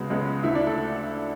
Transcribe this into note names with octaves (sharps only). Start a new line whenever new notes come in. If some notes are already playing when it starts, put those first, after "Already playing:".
Already playing: C#2 C#3 G#3 B3 F#4
C#2 C#3 G#3 B3
D2 D3 A3 E4 E5
D4 D5
A4